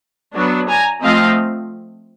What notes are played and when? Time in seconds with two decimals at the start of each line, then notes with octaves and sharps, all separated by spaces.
0.34 F#3 B3 D4
0.68 G#5 A#5
1.02 F3 A3 C4 D#5 F5